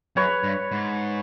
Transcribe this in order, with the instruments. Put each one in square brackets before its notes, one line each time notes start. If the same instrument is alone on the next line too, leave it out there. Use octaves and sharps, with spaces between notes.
[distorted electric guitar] F#2 [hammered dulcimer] B4 C#5
[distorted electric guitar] G2
G#2